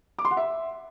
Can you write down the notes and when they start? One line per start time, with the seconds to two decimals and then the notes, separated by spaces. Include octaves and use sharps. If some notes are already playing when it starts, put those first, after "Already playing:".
0.19 D6
0.25 C6
0.31 F#5
0.37 E5